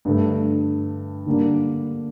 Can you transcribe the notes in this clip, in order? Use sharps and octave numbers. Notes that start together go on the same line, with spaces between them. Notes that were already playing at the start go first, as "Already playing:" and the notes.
G2 D3 A3
D3 G3 A#3 D4